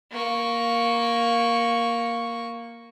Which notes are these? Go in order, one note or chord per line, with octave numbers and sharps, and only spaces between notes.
A#3 C#6